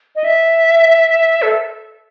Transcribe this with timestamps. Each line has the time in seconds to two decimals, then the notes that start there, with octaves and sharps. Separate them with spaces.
0.16 D#5
0.24 E5
1.42 A4